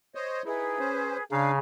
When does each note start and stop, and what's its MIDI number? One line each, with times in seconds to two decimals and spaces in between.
0.15 0.42 72
0.15 0.42 73
0.15 0.42 75
0.45 0.79 63
0.45 0.79 64
0.45 1.23 68
0.45 1.23 71
0.79 1.17 61
0.79 1.17 72
1.31 1.59 49
1.31 1.52 62
1.31 1.52 77
1.31 1.58 80
1.31 1.58 82